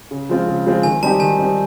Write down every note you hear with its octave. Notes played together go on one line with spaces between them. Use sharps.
C#3
F3 G#3 C4 F4
C#3
F3 G#3 C4 F4
D#3 G#5
G3 C4 D#4 G4 A5
D#3 G#5
G3 C4 D#4 G4